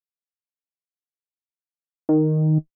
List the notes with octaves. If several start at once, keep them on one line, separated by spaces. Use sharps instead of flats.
D#3